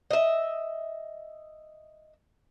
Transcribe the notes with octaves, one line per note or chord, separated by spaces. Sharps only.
D#5 E5